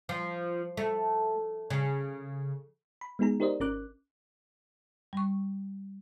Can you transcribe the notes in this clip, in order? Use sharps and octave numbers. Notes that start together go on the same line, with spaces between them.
F3
A3
C#3
B5
G#3 B3 D#4 G#4 A#5
D#4 G4 A#4 C5 D5 D#5
G#1 C#4 A#4 D6 F#6
G3 C#6